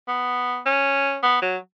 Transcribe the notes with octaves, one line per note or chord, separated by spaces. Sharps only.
B3
C#4
B3
F#3